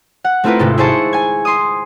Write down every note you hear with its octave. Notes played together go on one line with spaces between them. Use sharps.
F#5
A3 C4 E4 F4 A#4 B4
G#1 C3 A4
E4 G#4 C5 A5 C#6
G#5 G#6
C6 D#6